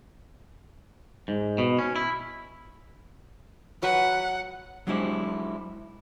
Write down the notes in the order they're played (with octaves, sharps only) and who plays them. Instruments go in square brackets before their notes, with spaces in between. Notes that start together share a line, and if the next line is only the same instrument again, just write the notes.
[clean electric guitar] G#2
B2
C#4
E4
[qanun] F#3 B4 E5 [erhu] F#5
[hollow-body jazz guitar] F#3 G#3 D4 E4 G4 C5